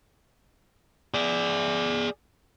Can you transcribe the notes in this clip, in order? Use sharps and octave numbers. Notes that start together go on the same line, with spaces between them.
G#4 D5